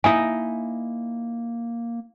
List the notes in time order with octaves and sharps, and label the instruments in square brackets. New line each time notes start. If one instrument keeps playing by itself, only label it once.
[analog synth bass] A#3 [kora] D#4 E4 D#5 [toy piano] G#5